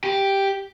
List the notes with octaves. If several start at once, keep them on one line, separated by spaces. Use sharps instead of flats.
G4